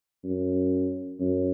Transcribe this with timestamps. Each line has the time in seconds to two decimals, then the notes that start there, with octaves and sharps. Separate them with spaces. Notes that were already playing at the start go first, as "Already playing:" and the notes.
0.24 F#2
1.20 F#2